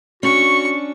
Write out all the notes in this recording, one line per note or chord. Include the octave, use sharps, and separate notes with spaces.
C#4 D4 F#4 C#6